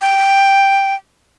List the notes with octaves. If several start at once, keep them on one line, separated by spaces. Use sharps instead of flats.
G5